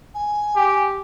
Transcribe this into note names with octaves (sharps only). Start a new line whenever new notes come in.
G#5
G4